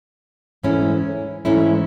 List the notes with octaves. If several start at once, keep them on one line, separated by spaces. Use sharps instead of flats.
G#2 E3 A3 C#4 E4
G#2 E3 A3 C#4 E4